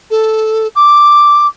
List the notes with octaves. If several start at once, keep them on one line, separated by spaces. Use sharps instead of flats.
A4
D6